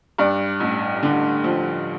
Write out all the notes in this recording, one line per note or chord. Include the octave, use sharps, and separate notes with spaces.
G2 D5
A1
D3
F3